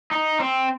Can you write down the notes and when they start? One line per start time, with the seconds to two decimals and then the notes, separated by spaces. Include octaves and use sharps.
0.11 D#4
0.40 C4